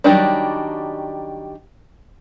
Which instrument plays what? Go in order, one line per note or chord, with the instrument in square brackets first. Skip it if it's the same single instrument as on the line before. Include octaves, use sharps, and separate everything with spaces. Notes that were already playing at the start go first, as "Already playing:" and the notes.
[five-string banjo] D#3 F#3 G3 C#4 D4